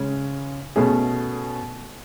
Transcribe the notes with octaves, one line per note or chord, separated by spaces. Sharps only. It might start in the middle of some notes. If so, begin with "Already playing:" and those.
Already playing: C#3 G#3 C#4
B2 A3 C#4 G#4